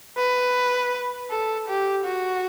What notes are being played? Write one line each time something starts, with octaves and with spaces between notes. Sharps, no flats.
B4
A4
G4
F#4